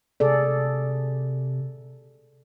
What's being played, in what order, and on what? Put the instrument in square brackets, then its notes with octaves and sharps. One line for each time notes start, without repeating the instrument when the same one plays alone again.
[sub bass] C3 [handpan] G#4 A4 D5